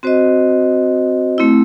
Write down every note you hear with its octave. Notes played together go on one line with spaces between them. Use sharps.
C4 F#4 C5 D#5
A3 C4 E4